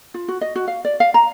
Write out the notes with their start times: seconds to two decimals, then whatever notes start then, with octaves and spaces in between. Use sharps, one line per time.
0.14 F4
0.28 F#4
0.41 D#5
0.56 F#4
0.68 F5
0.85 D5
1.00 F5
1.14 A#5